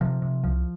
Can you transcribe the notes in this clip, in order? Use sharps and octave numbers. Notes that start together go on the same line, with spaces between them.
C3 F3
C3
C2 F3